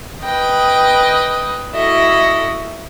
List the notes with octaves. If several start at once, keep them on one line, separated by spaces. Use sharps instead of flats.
B4 D#5 G5
E4 F#4 A4 D#5 E5